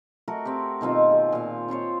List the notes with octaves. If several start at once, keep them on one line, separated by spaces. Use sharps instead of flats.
A3 F#4 A#4
C4 F#4 G4
B2 D#3 C4 F4
G#4
A#2 F5
C4 F4 C5 C#5